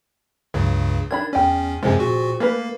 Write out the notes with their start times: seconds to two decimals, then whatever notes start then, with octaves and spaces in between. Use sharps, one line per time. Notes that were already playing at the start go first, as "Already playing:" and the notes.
0.54 C#2 G2 C#3 F#3
1.11 D#3 D4 B5 G#6
1.33 E2 C#4 D5 G5
1.83 F#2 C3 F3 G#3 C4 G#4
1.99 A#2 F#4
2.40 A3 A#3 A#4 B4